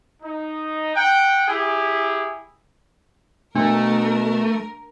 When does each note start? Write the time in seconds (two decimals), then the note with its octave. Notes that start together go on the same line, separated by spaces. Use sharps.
0.23 D#4
0.96 F#5 G5
1.48 E4 G4 G#4
3.55 B2 A3 D4 A#4